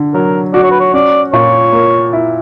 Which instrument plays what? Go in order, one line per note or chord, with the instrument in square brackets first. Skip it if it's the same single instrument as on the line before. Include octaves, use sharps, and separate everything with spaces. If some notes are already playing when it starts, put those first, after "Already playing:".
Already playing: [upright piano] D3
[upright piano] F#3 [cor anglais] A#4
[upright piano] F#4 [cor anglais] D5
[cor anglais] C#5
B4
C#5
[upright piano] C#4 [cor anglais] D5
[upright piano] A#2 [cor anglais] C#5
[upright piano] A#3
E4